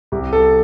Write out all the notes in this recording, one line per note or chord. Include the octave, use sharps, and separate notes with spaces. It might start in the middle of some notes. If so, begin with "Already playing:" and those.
C2 G4
A4